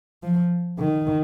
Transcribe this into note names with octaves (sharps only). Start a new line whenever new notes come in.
F3
D#3